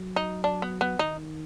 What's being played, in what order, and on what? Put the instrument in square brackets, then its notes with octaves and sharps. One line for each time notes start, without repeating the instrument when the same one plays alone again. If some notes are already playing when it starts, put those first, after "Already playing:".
Already playing: [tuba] F#3
[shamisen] D#4
D4
B3
B3
[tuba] D#3 [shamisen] D#4